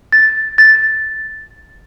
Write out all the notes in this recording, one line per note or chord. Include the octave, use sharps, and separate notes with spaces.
A6
A6